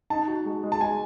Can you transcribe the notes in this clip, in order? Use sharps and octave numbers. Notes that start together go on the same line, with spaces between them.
D#4 A5
F#4
G#3
G#3
A5
G#3 G#5